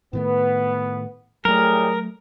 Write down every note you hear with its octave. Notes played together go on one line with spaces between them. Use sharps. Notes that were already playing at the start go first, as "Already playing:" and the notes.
A2 D#3 A3 B3
A2 F#3 G3 A3 G#4 A#4